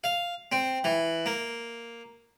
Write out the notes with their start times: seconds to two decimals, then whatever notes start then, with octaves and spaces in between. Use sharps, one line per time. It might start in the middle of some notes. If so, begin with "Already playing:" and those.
0.04 F5
0.52 C4
0.84 E3
1.26 A#3